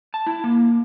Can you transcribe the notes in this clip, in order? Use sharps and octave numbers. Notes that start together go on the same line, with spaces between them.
A5
E4
A#3